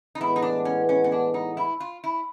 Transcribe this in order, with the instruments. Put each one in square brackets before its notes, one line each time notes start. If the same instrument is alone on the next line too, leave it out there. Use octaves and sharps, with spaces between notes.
[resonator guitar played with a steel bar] D#4
[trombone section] A2 E3 G#3 B3 [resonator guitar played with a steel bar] E4
[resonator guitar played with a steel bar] D#4
D4
C#4
C#4
C#4
D4
D#4
E4
F4
E4